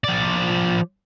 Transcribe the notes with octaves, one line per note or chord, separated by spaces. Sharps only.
F3 D5